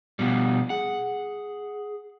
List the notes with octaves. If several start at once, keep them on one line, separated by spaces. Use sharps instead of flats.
B2 F3 G3 B3
G#4 F#5